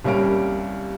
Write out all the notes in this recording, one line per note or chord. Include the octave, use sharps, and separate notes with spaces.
C2 G3 A#3 C#4 F6 D7